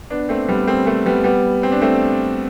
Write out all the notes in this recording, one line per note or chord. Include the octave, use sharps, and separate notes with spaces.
B3 D4
A3 C4
G3 B3
A3 C4
A3 C4
G3 B3
G3 B3
C4
D4
A3 C4